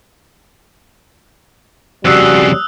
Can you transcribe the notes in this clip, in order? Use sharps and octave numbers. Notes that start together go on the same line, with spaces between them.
F2 C#3 G3 F#4 D#6 E6 F#6